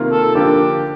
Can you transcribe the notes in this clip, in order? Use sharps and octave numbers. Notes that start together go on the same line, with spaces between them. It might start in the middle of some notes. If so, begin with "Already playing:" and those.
Already playing: C3 D#3 A#3 F4
A4
D3 F3 A#3 D4 G4